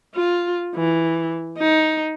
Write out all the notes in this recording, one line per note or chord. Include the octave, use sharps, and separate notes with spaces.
F4
E3
D#4